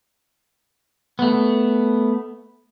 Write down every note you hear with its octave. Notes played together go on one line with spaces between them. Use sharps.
A3 B3